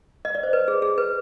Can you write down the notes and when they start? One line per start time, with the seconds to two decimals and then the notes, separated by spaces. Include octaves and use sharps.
0.25 D#5
0.35 D5
0.43 C5
0.53 B4
0.68 G#4
0.82 G#4
0.98 B4